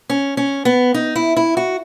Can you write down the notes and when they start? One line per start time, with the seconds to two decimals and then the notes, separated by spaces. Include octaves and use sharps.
0.10 C#4
0.37 C#4
0.65 B3
0.94 D#4
1.16 E4
1.37 E4
1.57 F#4